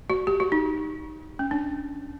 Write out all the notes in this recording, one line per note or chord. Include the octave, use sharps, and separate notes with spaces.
F#4
G4
F#4
D#4
C#4
D4